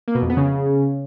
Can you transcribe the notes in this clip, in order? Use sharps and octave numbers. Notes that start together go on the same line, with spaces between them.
A#3
B2
F2
B3
C#3